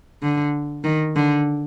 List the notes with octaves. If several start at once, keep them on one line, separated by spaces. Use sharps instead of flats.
D3
D#3
D3